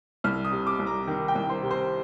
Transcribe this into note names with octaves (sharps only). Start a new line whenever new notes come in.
C2 F6
D#6
C3
D6
C2
A#5
D#3
G5
C2
C5
C3
C5